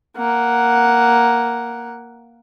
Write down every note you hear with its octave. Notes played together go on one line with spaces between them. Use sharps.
A#3 F#5